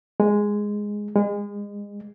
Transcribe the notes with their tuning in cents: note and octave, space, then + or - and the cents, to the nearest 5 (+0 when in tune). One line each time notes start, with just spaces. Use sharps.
G#3 -5
G#3 -30